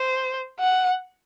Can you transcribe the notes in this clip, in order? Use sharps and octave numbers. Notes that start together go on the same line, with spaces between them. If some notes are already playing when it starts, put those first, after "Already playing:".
Already playing: C5
F#5